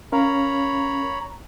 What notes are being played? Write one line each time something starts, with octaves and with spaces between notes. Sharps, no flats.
C#4 A#4 C#5 F5 A#5 B5